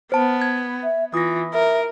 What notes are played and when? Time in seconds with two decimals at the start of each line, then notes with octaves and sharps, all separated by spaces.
0.12 B3 C5 A5
0.42 G#6
0.83 E5
1.14 E3 F4 D#6 A#6
1.53 A#4 E5